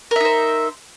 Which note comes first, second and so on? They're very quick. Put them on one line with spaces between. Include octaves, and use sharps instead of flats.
A#4 E5 D#4 C5